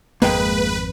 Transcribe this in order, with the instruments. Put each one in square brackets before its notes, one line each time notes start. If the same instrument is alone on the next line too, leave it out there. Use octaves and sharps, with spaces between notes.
[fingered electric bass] G#1 F2 [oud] G#3 [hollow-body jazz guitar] A#3 G5 [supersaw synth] B4